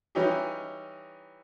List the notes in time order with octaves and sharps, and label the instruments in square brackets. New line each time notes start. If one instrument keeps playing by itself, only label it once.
[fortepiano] E3 G3 C#4 D#4 G4